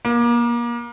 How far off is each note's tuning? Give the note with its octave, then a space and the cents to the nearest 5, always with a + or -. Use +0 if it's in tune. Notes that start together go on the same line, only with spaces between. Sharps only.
A#3 +30